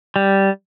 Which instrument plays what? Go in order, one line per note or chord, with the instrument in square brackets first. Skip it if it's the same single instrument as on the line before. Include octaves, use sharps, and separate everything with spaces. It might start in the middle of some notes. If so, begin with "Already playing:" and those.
[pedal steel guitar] G3